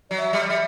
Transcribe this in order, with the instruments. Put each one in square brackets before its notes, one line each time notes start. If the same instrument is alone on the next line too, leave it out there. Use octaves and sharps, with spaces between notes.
[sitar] F#3 [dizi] D5
[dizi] E5
[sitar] G3
[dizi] D5
[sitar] G3 [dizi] E5